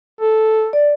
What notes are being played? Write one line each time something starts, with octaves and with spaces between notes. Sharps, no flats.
A4
D5